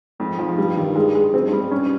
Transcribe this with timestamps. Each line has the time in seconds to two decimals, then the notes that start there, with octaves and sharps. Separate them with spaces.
0.20 F2 G#2
0.39 F3
0.58 G2 G3
0.77 D#3
0.95 G#3
1.15 G#3
1.34 F#2 C4
1.47 G2
1.52 G3
1.60 G2
1.71 G2 C#4